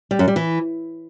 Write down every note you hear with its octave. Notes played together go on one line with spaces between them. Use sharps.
G3
F#2
G3
E3